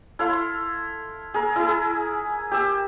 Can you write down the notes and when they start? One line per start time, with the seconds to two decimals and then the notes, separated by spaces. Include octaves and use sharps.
0.19 E4 A4 F5 C6
1.34 G#4 A#4
1.56 E4 G#4
2.51 G4 E6